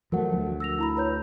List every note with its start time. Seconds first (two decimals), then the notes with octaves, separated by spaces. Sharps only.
0.12 F3 F#3 A3 A#4 F#5
0.33 D2
0.60 E6 A#6 F7
0.79 E4 A#5 B5
0.97 B4 C#5 G6